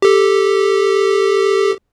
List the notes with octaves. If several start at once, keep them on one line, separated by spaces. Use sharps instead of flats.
G4 A4